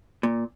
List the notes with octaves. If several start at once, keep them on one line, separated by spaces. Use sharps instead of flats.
A#2